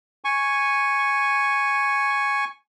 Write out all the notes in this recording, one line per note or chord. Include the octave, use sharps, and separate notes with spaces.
G#5 C#6